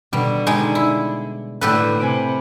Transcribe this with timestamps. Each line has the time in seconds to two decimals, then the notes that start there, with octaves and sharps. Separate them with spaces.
0.13 B2 D3 G3
0.46 G3 G#3 D#4 G#5
0.75 E4
1.61 A2 D3 G3 G4 A4 B4
2.00 C3 G#5 B5 D6